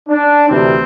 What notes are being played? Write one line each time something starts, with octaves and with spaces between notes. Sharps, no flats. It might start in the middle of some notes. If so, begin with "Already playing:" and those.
D4
D2 C3 E3 G3 C4